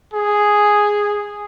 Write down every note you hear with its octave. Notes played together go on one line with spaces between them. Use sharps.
G#4